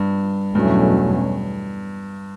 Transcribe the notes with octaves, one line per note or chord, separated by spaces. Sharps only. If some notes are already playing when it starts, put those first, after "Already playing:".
Already playing: G2
E2 G2 B2 F#3 A3 C#4